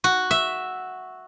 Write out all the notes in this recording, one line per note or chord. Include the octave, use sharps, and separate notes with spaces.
F#4
E5